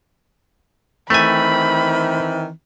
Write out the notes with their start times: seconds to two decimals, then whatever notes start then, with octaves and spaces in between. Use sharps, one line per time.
1.10 D#3 E3 A3 C4 G#5 B5